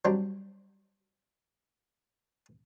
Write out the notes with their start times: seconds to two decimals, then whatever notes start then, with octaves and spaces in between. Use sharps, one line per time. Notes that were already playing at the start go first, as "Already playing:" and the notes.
0.05 F#3 G3 C4 D4